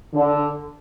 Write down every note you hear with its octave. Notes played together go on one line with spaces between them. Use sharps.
D3